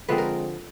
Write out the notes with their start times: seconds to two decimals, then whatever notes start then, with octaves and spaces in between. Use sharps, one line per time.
0.08 D3 F3 G#3 C4 B4
0.18 A#4